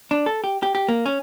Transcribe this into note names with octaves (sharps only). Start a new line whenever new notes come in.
D4
A4
G4
G4
G4
A#3
C#4